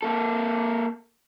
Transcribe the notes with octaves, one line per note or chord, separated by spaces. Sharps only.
A#3 A4